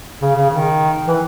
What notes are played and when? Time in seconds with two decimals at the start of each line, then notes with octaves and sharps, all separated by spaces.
0.21 C#3
0.36 C#3
0.50 D#3
1.07 E3